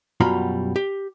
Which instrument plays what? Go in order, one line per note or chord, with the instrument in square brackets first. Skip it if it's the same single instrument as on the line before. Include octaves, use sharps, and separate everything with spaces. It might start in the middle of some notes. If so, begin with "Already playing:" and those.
[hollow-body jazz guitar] F#2 B2 G3 F4 A#5 B5
G4